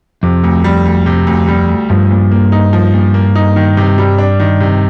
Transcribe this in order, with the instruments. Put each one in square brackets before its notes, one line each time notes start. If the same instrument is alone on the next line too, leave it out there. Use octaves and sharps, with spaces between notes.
[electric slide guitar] F2 [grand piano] C3
[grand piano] D2
G3
D2
C3
D2
G3
D2
[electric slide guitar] G2 [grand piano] F3
[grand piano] A#2
A#3
D#4
F3
A#2
A#3
D#4
D#3
C3
G3
D4
D#3
C3